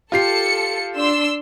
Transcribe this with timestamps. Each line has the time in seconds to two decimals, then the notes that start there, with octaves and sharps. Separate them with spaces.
0.12 F4 G4 A4 C7 C#7
0.97 D4 C6 E6